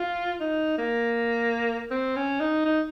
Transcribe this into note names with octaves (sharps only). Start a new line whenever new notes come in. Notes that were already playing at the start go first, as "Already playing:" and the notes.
Already playing: F4
D#4
A#3
C4
C#4
D#4
D#4